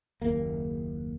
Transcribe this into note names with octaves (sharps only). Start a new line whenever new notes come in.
F#1 D#2 A#3